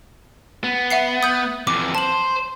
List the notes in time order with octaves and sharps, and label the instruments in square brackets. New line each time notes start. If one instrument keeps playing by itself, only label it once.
[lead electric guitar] B3
[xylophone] E5 F#5 C7
D#6 G6
[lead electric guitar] F2 E3 [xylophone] D6
[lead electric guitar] C5 [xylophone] A5 F#7